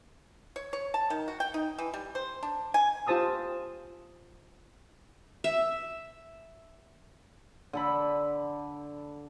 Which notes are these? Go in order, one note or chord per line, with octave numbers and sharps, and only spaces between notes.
C#5
C#5
A5
D#3
F#4
G5
D#4
E3
G3
C5
D4
G#5
F4 G4 C5 A5 D#6 E6
E5
D3 A4 B5